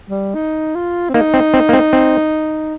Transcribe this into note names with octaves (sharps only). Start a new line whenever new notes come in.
G3
D#4
F4
C4
A#3 D#4
C4
C4
A#3
C4
C4